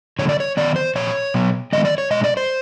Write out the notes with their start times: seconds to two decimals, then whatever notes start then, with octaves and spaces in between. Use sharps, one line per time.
0.19 D3 F3 A#3 C#5
0.29 D5
0.40 C#5
0.57 D#3 F#3 B3 D5
0.76 C5
0.96 A#2 F3 C#5
1.34 B2 F#3 B3
1.73 D#3 G#3 B3 D#5
1.85 D5
1.98 C#5
2.11 B2 G#3 D#5
2.24 D5
2.37 C5